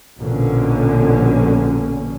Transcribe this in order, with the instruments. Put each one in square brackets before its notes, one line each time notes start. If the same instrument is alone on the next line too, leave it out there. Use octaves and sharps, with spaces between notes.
[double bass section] A#1 B2 D3 C#4